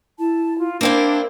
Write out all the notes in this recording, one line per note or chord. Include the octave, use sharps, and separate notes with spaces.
E4 A5
F4
A#3 C4 D4 E4 A#4